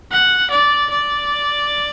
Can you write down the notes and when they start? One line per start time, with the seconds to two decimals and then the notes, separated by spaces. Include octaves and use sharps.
0.12 F#5
0.51 D5
0.90 D5